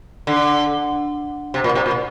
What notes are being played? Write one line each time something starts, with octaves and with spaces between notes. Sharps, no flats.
D3
C3
A#2
C3
A#2